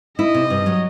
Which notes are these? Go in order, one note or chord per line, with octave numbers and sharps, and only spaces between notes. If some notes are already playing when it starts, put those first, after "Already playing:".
E4 D#5
C3
G2
F#3